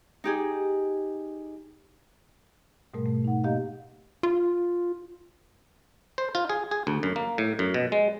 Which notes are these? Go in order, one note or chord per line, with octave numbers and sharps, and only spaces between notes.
D#4 G4 G#4
G#2 B2 G3 A3 A#4
A3
D#4 F#5
A#3 G4 D#5 F5
F4
C5
F4
G#4
G#4
D2
F#2
A#3
A2
F#2
B2
G#3